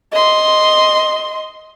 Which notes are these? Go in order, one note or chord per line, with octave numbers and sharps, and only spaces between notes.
D#5 C6